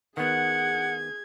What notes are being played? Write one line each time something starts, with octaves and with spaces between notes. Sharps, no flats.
D#3 B3 G#4 F#5 G#6